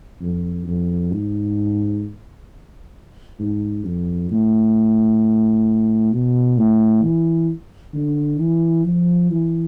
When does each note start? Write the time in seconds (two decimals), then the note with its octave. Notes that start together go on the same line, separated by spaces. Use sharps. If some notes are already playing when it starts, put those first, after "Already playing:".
0.21 F2
0.66 F2
1.12 G#2
3.39 G#2
3.85 F2
4.31 A2
6.12 B2
6.58 A2
7.02 E3
7.94 D3
8.40 E3
8.85 F3
9.30 E3